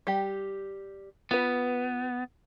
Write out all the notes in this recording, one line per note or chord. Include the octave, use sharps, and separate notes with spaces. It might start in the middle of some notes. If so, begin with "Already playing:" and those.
G3 G4
B3 F4 B4